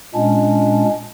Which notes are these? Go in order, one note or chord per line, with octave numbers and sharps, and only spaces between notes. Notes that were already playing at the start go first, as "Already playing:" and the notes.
A#2 G#3 C#4 D4